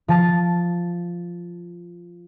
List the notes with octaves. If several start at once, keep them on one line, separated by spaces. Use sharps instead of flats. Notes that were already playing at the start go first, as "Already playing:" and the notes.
F3 A5 A6